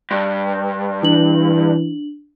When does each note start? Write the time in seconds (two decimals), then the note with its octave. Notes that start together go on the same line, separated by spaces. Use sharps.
0.11 G2
1.03 E3 D4 F#7